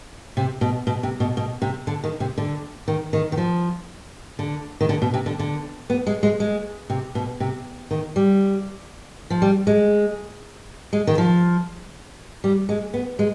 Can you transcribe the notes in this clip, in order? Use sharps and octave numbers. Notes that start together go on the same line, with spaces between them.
C3
B2
B2
C3
B2
B2
C3
D3
D#3
C3
D3
D#3
D#3
D#3
F3
D3
D#3
D3
B2
C3
D3
D3
B3
G#3
G#3
G#3
C3
B2
C3
D#3
G3
F3
G3
G#3
G#3
D#3
F3
G3
G#3
B3
G#3